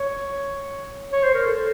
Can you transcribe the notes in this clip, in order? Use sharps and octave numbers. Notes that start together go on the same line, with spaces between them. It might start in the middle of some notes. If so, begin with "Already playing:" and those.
Already playing: C#5
C#5
C5
A#4
A4